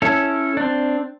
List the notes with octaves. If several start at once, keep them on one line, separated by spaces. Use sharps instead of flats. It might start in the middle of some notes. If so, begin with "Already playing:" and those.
C#4 E4 A4
C4 D4